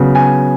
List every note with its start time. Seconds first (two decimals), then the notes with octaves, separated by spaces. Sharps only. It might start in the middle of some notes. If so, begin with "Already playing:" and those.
Already playing: C#3 F#3 B3
0.15 G#5